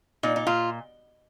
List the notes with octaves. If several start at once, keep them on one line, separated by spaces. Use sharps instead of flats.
A#2 D#4
D#4
A#2 F4